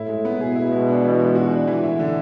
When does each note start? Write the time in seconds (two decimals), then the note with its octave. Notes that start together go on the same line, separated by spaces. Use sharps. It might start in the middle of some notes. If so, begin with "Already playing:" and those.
Already playing: A2 E4
0.08 G#3
0.25 B3
0.40 B2 G#4
0.56 E4
0.71 G#3
0.88 D4
1.04 E3
1.20 G#3
1.35 F#4
1.51 D4
1.67 E3
1.83 A2 E4
1.99 D3